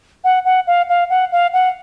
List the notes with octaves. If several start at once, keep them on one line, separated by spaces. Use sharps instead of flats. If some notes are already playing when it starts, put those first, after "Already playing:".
F#5
F#5
F5
F5
F#5
F5
F#5